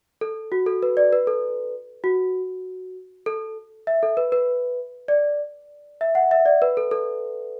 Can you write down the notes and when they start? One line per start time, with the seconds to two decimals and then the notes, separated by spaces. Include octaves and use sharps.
0.21 A4
0.52 F#4
0.66 A4
0.83 B4
0.97 D5
1.13 B4
1.27 A4
2.04 F#4
3.26 A4
3.87 E5
4.03 A4
4.17 B4
4.32 B4
5.08 D5
6.01 E5
6.15 F#5
6.31 E5
6.46 D5
6.62 B4
6.77 A4
6.91 A4